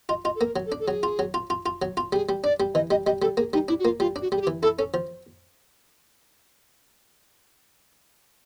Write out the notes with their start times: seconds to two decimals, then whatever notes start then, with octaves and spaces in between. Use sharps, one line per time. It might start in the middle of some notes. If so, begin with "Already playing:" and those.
0.09 F4 D#5
0.24 F4 D#5
0.36 A4
0.41 A#3 A#4
0.56 F#3
0.66 A4
0.72 D4
0.80 A4
0.87 F#3 G#4
1.03 F4
1.19 F#3
1.34 F4
1.50 F4
1.66 F4
1.82 F#3
1.97 F4
2.13 G3 G#4
2.29 G3
2.44 D4 D5
2.60 G3
2.75 E3 D#5
2.91 G3 D#5
3.06 G3 D#5
3.22 G3 A4
3.37 A#3 G#4
3.53 G3 D#4
3.68 D4 E4
3.80 F#4
3.84 A#3 F4
4.00 G3 F4
4.16 D4
4.22 F#4
4.32 G3 G#4
4.41 G4
4.47 E3
4.63 E4 A4
4.78 C#4 A4
4.94 F3